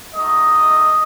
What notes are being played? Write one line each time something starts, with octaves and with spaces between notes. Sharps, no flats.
A3 D#4 F#4 D#5